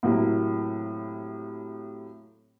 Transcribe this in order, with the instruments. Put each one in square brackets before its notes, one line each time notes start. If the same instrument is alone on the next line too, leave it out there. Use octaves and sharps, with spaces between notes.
[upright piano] A2 C3 F#3 A#3